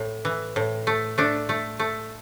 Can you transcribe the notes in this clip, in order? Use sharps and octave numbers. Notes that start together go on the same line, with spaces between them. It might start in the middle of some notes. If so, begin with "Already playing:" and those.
Already playing: A2
E3
A2
A3
A3 D4
A3
A3